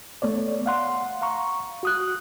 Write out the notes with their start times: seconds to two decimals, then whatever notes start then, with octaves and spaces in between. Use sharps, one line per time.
0.22 A3 B3 C#5 D5
0.66 F5 F#5 C6
1.22 F5 A#5 C#6
1.83 F#4 D#6 F#6